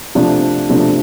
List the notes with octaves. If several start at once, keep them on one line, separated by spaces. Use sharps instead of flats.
C3 F3 A3 D4
C3 F3 A3 D4